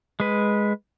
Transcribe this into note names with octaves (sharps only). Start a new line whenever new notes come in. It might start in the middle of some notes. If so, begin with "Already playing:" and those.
G#3 B4